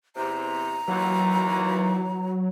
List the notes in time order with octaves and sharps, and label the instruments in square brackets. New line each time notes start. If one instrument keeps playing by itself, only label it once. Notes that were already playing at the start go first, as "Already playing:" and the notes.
[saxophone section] E2 C3 [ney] A#5
[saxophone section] D#2 E3 [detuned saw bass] F#3